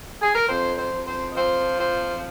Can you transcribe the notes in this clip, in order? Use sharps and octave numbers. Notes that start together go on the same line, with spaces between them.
G#4
A#4
F2 C5
C5
F2
C5
D#5
F3 C5
F2 C5